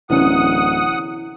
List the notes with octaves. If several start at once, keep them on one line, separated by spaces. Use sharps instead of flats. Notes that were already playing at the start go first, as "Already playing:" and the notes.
D1 C3 E3 C#4 E4 F#5 D#6